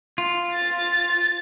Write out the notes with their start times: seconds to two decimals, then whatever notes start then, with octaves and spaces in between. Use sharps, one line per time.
0.18 F4
0.53 A6